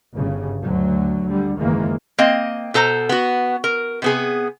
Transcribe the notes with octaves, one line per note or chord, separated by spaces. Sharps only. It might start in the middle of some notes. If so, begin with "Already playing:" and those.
G1 C#3
D2 D3 F#3
D3 G3
F#1 D#3 E3 G#3 A#3
A#3 C4 D#5
B2 A4 C5 A#5
B3 F#4
A#4
C3 B3 G#4